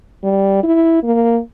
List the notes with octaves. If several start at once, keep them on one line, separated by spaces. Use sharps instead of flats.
G3
E4
A#3